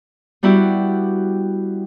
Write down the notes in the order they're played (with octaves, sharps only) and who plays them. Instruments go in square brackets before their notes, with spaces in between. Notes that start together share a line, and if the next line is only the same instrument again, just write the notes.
[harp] G3 B3 E4 F#4 G4